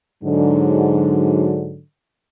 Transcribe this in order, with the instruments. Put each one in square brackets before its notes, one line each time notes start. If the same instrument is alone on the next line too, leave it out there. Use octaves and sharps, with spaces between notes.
[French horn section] G#2 D3 F#3